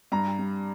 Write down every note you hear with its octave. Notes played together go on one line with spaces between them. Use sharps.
G2 A#5
G3